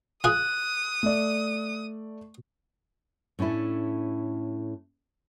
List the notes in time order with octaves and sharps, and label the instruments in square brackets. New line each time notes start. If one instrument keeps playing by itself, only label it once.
[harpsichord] F4 G#4 [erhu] D#6 [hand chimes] F#6
[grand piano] A3 D5
[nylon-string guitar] A2 C#4 D4 E4 A4